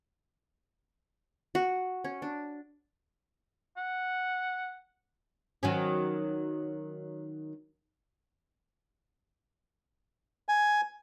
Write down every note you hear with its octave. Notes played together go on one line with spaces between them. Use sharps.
F#4
C#4
D4
F#5
D#3 F#3 C#4
G#5